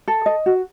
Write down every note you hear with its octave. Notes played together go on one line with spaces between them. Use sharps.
A4
D#5
F#4